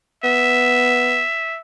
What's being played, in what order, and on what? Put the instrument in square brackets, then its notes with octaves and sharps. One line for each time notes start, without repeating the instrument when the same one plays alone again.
[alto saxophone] B3 [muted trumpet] E5